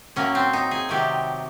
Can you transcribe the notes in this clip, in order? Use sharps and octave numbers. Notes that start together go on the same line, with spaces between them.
A2 F#3 A#3 C#4
C4
D#4
G#4
C3 D#3 F#3 A3 G4